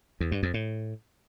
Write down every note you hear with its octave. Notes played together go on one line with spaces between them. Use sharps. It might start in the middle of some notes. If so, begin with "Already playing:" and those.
E2
G2
F2
A2